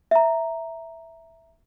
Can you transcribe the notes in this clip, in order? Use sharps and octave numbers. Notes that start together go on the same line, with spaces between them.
E5 A#5